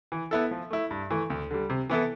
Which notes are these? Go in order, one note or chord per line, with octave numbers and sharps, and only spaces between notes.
E3
B3 E4 A4
F3
A3 E4
G2
E3 A3
D2
D3 G3
C3
E3 B3 E4 A4